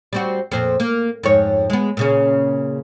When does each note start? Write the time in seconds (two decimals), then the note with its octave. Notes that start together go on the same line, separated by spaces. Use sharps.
0.13 G3 C4 F#4
0.52 F2 A#2 C5
0.80 A#3
1.23 F2 G#2 C#5
1.70 G#3 B3
1.97 A#2 C#3 C#4